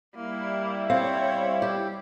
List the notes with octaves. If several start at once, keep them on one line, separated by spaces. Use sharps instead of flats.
G3 A#3 E4
C4 C#5 F5
G4